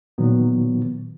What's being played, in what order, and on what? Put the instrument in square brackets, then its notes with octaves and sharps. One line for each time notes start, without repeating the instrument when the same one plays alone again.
[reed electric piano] A#2 D#3 F#3 B3